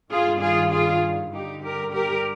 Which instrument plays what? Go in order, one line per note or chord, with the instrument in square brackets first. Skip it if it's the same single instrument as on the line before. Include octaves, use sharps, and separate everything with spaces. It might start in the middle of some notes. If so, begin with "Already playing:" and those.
[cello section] G2 D#3 F4 G#4
F4 G#4
F4 G#4
G2 D3 D#4 G4
G4 A#4
G4 A#4